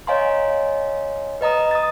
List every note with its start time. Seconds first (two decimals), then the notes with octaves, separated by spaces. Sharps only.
0.07 C#5 D#5 F5 G#5 A#5 C6
1.41 B4 D#5 A#5 D#6
1.71 D#6 A6